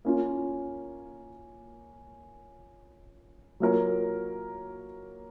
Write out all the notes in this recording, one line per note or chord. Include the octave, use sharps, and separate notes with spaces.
A#3 C#4 F4
F#3 A#3 F4 A#4 C#5